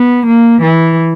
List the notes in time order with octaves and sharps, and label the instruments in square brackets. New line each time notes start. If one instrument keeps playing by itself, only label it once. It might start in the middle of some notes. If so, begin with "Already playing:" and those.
Already playing: [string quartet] B3
A#3
E3